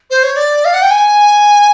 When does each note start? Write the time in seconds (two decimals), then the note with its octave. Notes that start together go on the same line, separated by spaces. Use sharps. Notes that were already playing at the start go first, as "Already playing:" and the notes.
0.10 C5
0.23 C#5
0.36 D5
0.64 F5
0.73 F#5
0.82 G5
0.90 G#5